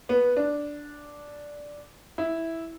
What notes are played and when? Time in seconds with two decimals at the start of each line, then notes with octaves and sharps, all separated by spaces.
0.09 B3
0.37 D4
2.18 E4